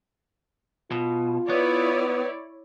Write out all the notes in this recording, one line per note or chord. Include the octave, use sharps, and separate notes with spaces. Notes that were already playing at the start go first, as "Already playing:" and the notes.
B2 F4
B3 E4 B4 C#5 D5